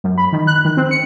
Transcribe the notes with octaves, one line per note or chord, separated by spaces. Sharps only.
F#2
B5
D#3
F#6
D#3
C4
C#7